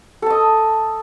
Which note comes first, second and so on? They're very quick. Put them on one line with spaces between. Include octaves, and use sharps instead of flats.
A4 A5 D#5